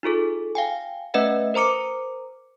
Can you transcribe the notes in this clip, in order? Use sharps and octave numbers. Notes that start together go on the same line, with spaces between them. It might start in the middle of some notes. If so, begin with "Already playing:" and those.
D#4 F4 G#4 A4
F5 G5 G#5
A3 C#4 B4 D#5 E5 F#5
A#4 C5 A#5 D6 C#7